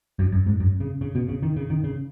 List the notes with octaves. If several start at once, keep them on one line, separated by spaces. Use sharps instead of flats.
F#2
F#2
G#2
F#2
C#3
C#3
B2
C#3
D#3
C#3
D#3
C#3